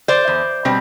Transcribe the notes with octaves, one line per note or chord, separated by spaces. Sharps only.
C5 D5
E2
B2 G3 C4